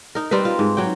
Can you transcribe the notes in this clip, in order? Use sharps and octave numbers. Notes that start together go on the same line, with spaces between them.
D#4 A#4
G3 C4 A#4 B4
F4
G#2
F#3 G5